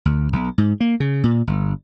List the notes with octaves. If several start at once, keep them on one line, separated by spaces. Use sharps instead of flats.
D2
B1
G#2
A#3
C#3
A#2
G1